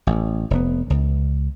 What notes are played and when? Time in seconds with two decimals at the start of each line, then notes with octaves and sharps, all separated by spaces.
0.07 A1
0.51 F1 B3
0.90 C#2